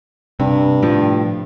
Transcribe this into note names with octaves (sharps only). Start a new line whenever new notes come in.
G2 C3
A2 F3